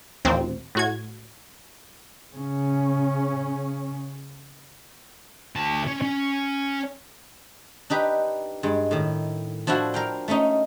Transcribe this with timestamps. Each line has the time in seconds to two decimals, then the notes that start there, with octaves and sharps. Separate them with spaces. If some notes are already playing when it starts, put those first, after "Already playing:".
0.25 A1 D#2 A#2 C4
0.75 A2 F#4 G#6
2.36 C#3 C#4
5.56 D2 A5
5.87 C#4
6.02 C#4
7.90 D4 D#4 G4 B4
8.63 G2 G#3
8.91 A2 D#3
9.67 F3 D4 E4 F#4
9.94 A#4 F5 G5
10.28 A3 A#3 C#4 D#4